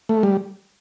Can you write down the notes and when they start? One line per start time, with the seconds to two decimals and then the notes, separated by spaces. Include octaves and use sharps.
0.09 A3
0.23 G3